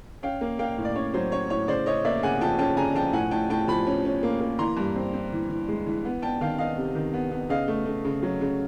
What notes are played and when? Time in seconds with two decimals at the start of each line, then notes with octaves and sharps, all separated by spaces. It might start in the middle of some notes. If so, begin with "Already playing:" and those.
0.23 C#4 F5 G5
0.41 A#3
0.59 A#3 F5 G5
0.78 A2
0.85 D5
0.95 C#4 C#5
1.14 F#3 C5
1.32 C#4 C#5
1.50 A2 C#5
1.68 C#3 C5 D5
1.86 C#4 C#5 D#5
2.05 A#3 D5 E5
2.23 C#3 F#5 G#5
2.41 F3 G5 A5
2.59 C#4 G5 A5
2.77 C#3 G#5 A#5
2.95 F3 G5 A5
3.13 A2 F#5 G#5
3.31 A2 G5 A5
3.50 A2 G5 A5
3.68 F3 A5 B5
3.87 C#4
4.05 C#4
4.23 A#3
4.40 A#3
4.59 E3 A#5 C6
4.77 G2
4.95 C4
5.14 C4
5.32 E3
5.50 E3
5.69 G#3
5.86 E3
6.05 B3
6.22 B3 G5 A5
6.41 D#3 F5 G5
6.58 B3 D#5 F5
6.78 C3
6.95 D#3
7.14 B3
7.32 B3
7.49 C#3 D#5 F5
7.68 A3
7.86 A3
8.05 C#3
8.23 F#3
8.41 C#3